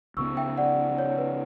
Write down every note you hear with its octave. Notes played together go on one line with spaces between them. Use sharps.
C#2 C#3 F#3 B3 C#6 E6
E5 G5
D5 F#5
C#5
B4